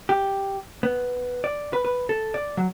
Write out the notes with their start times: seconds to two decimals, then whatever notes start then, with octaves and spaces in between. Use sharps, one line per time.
0.09 G4
0.83 B3
1.44 D5
1.73 B4
1.85 B4
2.09 A4
2.34 D5
2.57 F#3